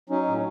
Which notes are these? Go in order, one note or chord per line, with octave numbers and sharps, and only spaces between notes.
F#3 C#4 D#4
A2